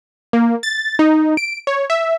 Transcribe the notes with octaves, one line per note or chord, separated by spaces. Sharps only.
A#3
A6
D#4
D7
C#5
E5